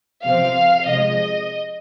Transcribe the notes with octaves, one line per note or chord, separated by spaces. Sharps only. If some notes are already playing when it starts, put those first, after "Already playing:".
C3 F3 C4 F5
C3 F3 G#3 D#5